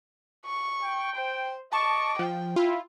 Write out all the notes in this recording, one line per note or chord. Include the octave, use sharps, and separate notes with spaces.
C#6
G5
C5
D#5 A5 C#6 D6
F3 G5
E4 F4